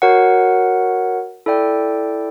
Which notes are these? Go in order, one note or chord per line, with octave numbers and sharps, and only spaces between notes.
F#4 A#4 C#5 F#5
E4 A4 D5 G5